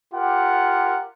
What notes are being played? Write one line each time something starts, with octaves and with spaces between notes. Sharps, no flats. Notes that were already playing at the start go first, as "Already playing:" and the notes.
F4 G4 A#4 F#5